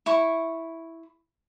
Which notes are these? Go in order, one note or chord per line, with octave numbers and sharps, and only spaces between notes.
E4 C#6